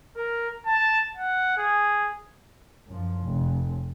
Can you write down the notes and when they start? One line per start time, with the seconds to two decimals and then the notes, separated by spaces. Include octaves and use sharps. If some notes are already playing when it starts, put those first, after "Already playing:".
0.17 A#4
0.66 A5
1.17 F#5
1.58 G#4
2.87 F#2 F3
3.24 F1